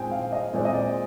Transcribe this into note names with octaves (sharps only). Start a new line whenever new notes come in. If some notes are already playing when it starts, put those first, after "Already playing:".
Already playing: A#2 G#3 C4 G5 G#5
F5
D#5
A#2 G#3 C4 D5
D#5
D5